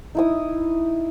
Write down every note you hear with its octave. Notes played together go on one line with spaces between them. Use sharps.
D#4 E4 D#6